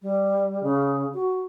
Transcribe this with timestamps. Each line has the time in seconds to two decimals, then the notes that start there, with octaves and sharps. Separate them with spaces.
0.02 G3
0.63 C#3
1.14 F#4